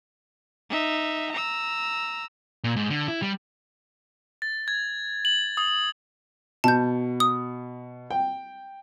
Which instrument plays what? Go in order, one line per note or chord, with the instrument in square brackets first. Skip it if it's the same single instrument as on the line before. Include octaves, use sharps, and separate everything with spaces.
[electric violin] D#4 E5
A#5 E6
[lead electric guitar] A#2
G#2
D3
E4
G3
[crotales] A6
G#6
F#7
D#6
[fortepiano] B2 [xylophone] A5 G6
[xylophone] D#6
[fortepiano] G5